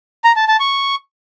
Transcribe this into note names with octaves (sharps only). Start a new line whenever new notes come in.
A#5
A5
A5
C#6